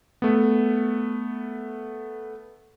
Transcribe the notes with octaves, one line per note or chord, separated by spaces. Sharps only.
A3 B3